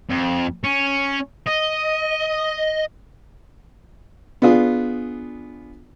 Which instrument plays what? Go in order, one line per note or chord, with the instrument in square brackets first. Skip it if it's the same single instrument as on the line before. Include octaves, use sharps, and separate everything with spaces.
[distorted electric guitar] F2
C#4
D#5
[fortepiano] B3 D4 F4 G#4